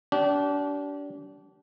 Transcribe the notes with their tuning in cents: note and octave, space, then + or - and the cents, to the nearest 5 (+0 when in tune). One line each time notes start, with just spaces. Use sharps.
D4 -30 G4 -35